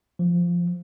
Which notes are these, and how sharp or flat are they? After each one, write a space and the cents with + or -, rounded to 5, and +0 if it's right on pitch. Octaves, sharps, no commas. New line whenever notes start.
F3 -5